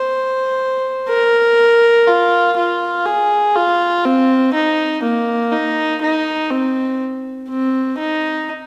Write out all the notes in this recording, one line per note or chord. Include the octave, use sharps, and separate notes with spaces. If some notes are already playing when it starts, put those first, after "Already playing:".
Already playing: C5
A#4
F4
F4
G#4
F4
C4
D#4
A#3
D#4
D#4
C4
C4
D#4